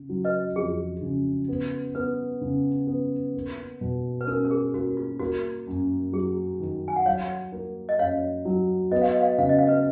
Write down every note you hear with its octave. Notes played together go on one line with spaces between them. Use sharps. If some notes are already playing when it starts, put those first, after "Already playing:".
Already playing: C#3
F#3
B4 D#5
F2 G#4
C#3
B3
B3 B4
C#3
B3
A#3
B2
B4
C#4 A#4
A#4
G#4
A#3 F#4
F4
A#3 F#4
F#2
F#3 G#4
D#3
G#5
F#5
F#3 C#5 F5
A#3
D#5
F#2 C#5 F5
F#3
B3 D#5
F5
D#5
F5
D#5
C#3 F5
D#5
F5
B4 D#5